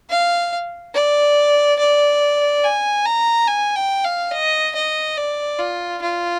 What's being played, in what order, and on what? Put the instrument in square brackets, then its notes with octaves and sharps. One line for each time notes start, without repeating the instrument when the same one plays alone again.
[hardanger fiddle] F5
D5
D5
G#5
A#5
G#5
G5
F5
D#5
D#5
D5
F4
F4